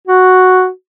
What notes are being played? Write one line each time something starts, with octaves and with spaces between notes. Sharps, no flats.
F#4